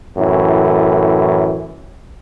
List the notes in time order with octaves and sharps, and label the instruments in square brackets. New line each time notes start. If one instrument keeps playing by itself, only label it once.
[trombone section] F#2 A2 E3